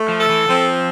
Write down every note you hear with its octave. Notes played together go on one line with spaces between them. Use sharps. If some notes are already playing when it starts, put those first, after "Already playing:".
Already playing: A3
F3
A4
E3
F3 C4